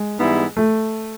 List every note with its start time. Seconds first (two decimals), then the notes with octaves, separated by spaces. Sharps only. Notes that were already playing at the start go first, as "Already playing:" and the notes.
Already playing: G#3
0.18 G#2 E3 G3 B3 E4
0.57 A3